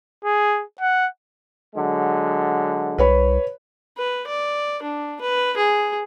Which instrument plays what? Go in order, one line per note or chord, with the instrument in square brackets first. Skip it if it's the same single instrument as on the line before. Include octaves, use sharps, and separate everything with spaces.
[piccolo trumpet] G#4
F#5
[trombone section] D3 F#3 G#3
[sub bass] C2 [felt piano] B4 C#5 B5
[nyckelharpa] B4
D5
D4
B4
G#4